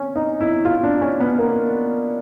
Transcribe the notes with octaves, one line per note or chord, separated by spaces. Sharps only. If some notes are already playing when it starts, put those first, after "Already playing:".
Already playing: C#4
D#4
E4
F4
D4
C#4
B3
A#3